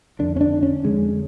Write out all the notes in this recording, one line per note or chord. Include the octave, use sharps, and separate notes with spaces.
F2 D3 D4
C#4
D4
C#4
F2 D3 G#3